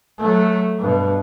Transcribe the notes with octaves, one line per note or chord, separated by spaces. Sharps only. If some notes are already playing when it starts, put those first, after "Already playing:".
F#3 A3
G2 B2